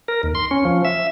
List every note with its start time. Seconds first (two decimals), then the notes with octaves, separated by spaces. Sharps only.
0.08 A#4
0.23 D#2
0.35 C6
0.51 C#4
0.65 F3
0.85 E5